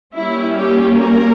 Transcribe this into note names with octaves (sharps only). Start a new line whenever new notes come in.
G3 A#3 C#4 E4
G4
A#4